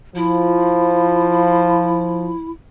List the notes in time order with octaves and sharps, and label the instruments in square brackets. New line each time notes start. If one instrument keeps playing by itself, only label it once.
[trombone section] F3 [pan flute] E4